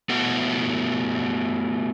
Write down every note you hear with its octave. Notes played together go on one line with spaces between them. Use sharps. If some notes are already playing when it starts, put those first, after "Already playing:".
A3 B3 E4 F#4 F#5